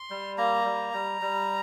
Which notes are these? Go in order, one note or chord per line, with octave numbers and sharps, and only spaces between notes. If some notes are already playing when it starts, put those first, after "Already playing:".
Already playing: C6
G3
A#3 A#5
G3
G3
G3